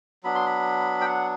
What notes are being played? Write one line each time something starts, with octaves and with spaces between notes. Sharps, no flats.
F#3 B3 D4 B5
C6
B5
G5
F#5